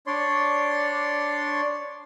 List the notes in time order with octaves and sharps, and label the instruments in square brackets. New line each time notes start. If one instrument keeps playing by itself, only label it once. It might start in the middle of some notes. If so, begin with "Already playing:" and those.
[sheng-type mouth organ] D4 C#5 D5 C6